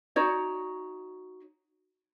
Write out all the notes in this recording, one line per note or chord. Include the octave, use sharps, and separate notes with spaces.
D#4 F#4 C#5 D5